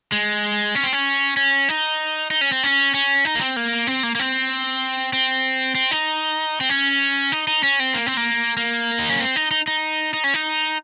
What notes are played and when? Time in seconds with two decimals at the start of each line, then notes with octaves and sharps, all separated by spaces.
0.12 G#3
0.75 C#4
0.84 C4
0.93 C#4
1.37 C#4
1.69 D#4
2.31 D#4
2.41 C#4
2.52 C4
2.63 C#4
2.94 C#4
3.25 D#4
3.35 A#3
3.41 C4
3.56 A#3
3.87 C4
4.03 A#3
4.15 A#3
4.19 C4
5.13 C4
5.75 C4
5.91 D#4
6.61 C4
6.69 C#4
7.32 D#4
7.48 D#4
7.64 C#4
7.80 C4
7.94 A#3
8.07 C4
8.17 A#3
8.57 A#3
8.99 D#4
9.09 C#4
9.20 C4
9.36 D#4
9.51 D#4
9.68 D#4
10.14 D#4
10.24 C#4
10.34 D#4